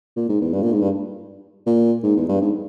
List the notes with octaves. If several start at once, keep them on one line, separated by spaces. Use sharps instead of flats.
A#2
G#2
E2
G2
A#2
G#2
G2
A#2
G#2
E2
G2
G#2